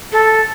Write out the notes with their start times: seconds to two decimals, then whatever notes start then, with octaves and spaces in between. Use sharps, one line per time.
0.12 A4